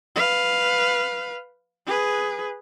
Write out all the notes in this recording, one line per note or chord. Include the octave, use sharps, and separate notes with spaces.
B4 F5
G#4 B4